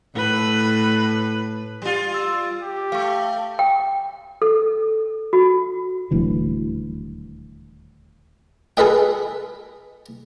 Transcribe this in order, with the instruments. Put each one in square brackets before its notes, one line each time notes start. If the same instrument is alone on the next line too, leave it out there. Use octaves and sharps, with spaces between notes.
[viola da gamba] A2 B4
[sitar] G3 F4
[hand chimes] E6
[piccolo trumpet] G4
[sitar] A3 [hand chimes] F5 C#6
[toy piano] G5
A4
F#4
[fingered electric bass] D#1 D2 E3 F#3
[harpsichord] G#4 A4 B4 D#5 G5